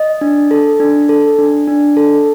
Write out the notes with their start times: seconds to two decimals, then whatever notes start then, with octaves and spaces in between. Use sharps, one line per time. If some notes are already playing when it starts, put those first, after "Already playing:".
Already playing: D#5
0.21 D4
0.51 A4
0.80 D4
1.09 A4
1.38 D4
1.68 D4
1.97 A4